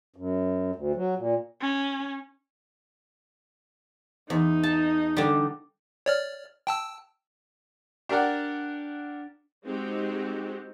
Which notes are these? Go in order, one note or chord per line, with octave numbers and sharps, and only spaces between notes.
F#2
D2
F#3
A#2
C#4
E2 D#4
A5
D3 G3
C#5 D5 F6
G5 A5 E6
D4 G4 A#4 D5 F#5
G#3 C4 D#4 F#4 G4